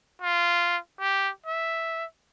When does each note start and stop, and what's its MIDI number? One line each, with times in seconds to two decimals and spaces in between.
0.21 0.77 65
1.00 1.29 67
1.46 2.05 76